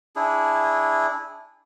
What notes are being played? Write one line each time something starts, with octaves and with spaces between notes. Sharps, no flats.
D4 E4 G#4